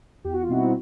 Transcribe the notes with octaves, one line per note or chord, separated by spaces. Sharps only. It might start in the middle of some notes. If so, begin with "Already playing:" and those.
E2 G4
F#4
F4
B2 G3 C4 D#4 E4 F#4